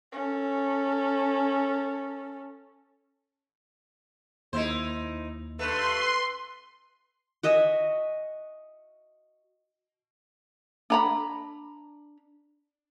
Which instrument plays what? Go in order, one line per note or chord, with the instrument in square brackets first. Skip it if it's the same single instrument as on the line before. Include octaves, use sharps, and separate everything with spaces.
[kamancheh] C#4 A4
[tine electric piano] D#2 [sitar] D#4 E4 C5
[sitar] G2 A3 [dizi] B4 [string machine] C6
[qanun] F#4 D#5 E5 G#5
[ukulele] D4 A#5 B5